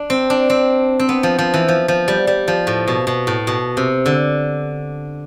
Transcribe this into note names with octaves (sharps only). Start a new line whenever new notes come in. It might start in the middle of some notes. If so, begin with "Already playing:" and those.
Already playing: D4
C4
D4
C4
C4
B3
F3
F3
E3
F3
F3
G3
G3
F3
A2
B2
B2
A2
B2
C3
D3